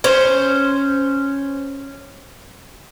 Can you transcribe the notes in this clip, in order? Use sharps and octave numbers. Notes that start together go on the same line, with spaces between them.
C#4 C5